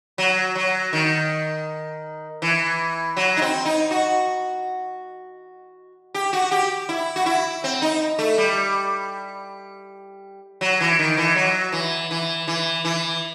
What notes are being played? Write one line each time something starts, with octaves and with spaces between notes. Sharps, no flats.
F#3
F#3
D#3
E3
F#3
D#4
C4
D#4
F#4
G4
F#4
G4
E4
F#4
E4
C4
D#4
A3
G3
F#3
E3
D#3
E3
F#3
E3
E3
E3
E3